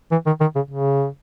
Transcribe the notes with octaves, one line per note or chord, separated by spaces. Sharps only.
E3
D#3
D#3
C#3
C#3